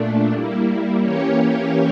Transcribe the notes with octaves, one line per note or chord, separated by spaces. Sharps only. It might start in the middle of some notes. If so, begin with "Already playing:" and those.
Already playing: A#2 A3 D4
G3 A#3 E4
E3 A#3 C#4 G4 C#5